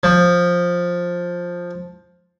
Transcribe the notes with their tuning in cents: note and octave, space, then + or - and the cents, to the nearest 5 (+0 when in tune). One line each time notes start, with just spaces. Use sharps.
F3 +10